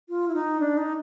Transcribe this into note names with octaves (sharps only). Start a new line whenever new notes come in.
F4
E4
D#4
D4
D#4